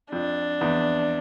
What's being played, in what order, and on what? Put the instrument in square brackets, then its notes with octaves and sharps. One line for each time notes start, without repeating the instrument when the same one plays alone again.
[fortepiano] F2 [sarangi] D4
[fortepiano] E2